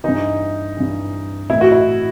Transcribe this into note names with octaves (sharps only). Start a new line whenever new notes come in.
G2 E3 D#4
G2 E3
A2 E3 E4
F#4
E4